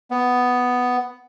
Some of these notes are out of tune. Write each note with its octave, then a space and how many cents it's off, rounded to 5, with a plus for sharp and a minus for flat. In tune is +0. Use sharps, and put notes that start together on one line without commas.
B3 +5